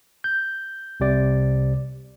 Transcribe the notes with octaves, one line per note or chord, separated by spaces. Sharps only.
G6
C2 C3 D5